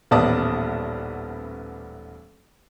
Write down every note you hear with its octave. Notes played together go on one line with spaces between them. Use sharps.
D#1 A1 B3 D5 A5 D#6